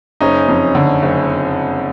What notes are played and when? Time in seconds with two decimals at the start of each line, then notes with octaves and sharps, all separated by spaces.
0.21 F#1 C#4 D#4
0.48 F2
0.75 D3
1.02 F#1